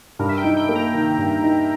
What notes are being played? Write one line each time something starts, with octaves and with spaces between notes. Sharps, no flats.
G2 A#4
E5
G5
D#4
G5
A#3
A#5
D#3
G2
D#4